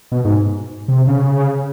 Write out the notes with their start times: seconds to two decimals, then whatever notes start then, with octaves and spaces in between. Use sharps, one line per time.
0.12 B2
0.25 G#2
0.88 C3
1.07 C#3